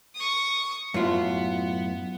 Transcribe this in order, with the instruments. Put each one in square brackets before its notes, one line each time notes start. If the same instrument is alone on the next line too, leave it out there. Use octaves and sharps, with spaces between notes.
[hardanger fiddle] C#6 D#6
[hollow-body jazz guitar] F#2 A2 F4 [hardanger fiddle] B3